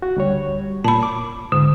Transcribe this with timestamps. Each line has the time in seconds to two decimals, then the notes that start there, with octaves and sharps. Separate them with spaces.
0.02 F#4
0.16 D2 G3 C#5
0.85 A#2 A5 B5
1.03 D6
1.52 G#2 D3